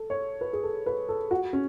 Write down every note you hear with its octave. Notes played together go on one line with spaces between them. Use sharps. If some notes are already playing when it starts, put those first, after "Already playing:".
Already playing: A4
C#5
B4
G#4
A4
B4
A4
F#4
C#4